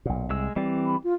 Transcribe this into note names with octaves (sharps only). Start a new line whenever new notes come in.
B1 A#2
C2 G#3 E6
E3 G3 C4 D5
B5
F4